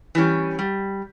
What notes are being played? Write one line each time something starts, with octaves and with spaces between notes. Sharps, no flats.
E3 G3 C#4 G4
G3